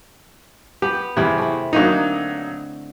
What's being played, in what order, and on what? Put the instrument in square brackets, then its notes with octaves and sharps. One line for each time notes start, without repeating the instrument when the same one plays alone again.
[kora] B3 [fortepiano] G4
[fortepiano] E2 [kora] C3 C4 E4
[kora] A3 E4
[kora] D3 D#5 [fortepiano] F#3 A#3 D#4